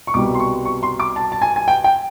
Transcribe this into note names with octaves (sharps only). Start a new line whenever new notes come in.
C#6
C2 B2 G3 D6
C6
C#6
C#6
C6
D6
A5
A5
G#5
G#5
G5
G5